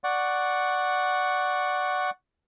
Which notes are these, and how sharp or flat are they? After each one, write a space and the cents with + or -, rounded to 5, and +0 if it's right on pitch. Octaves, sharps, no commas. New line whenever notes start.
D5 +0 F#5 +0 C#6 +0